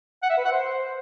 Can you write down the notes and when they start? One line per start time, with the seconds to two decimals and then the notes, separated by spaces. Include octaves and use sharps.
0.23 F#5
0.30 E5
0.37 B4
0.44 F#5
0.52 C5